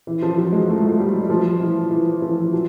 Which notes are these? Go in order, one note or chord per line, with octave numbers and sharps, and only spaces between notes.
E3
F3
F#3
G#3
A3
A3
G3
F#3
F3
E3
E3
F3
F#3